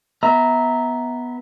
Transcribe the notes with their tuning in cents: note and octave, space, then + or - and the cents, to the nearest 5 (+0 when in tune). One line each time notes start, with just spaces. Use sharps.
B3 +0 E5 -25 A#5 +0